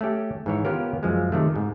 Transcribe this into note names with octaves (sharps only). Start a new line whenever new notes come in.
A3 C#4 G4
G#2 E3 C#5
B3 C#4 F4 G4 A#4
F#2 F3 G#3
C3 D#3 A3
G#2